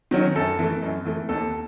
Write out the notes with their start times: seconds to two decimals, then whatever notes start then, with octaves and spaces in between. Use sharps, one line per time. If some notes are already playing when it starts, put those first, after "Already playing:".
0.11 D#3 F#3 C#4
0.36 F#2 A4
0.59 E3 A3
0.83 F#2
1.05 E3 A3
1.29 D#2 A4